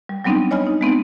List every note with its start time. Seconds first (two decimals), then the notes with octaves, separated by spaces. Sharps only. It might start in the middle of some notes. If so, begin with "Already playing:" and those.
0.09 G3
0.24 F#3 G3 B3 C4 D4 D#4
0.51 C#5 D#5 G#5 B5 F6
0.67 D#4
0.81 G#3 B3 C4 D#4